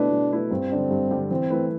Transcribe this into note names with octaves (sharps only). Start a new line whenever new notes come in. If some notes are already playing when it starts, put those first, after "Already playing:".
Already playing: B2 A3 D4 E4 B4
B2
A3 E4 B4
G2 C4
D3 G3 D4 G4
G2
D3 G3 D4 G4
E3 C4
A3 E4 B4